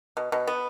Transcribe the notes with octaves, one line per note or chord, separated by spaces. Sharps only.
B2
B2
B3